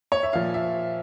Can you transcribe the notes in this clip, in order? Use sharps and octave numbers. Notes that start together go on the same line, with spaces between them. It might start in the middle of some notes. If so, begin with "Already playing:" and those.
C#5
E5
A#2 F3 F5
E5